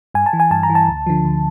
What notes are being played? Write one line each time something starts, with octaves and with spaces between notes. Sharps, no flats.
G2 G#5
A5
E3
G#5
G2 A5
A#5
E3
A5
D2
D3 F3
D2